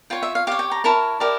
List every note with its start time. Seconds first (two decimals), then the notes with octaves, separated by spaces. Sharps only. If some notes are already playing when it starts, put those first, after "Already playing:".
0.10 F4 C#5 G5
0.23 E5
0.35 F5
0.47 G4 C#5 F5
0.59 G5
0.71 A#5
0.84 E4 A#4 C#5 A5
1.20 E4 G4 A#4 D5